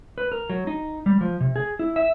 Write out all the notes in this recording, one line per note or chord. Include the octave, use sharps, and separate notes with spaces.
B4
A#4
F#3
D#4
G3
F3
C3
G#4
E4
E5